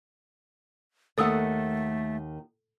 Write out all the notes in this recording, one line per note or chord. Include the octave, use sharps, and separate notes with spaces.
D#2 D#3 A3 A4 F#5 D#6 E6